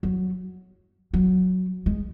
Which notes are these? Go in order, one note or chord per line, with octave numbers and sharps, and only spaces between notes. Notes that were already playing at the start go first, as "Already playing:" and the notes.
F#3
F#3
G#3